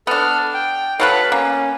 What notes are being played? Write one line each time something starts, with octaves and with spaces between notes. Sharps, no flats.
B3 D4 A4 F6
G5
B2 F#3 A4 B4 F5 F#5
A#3 C#4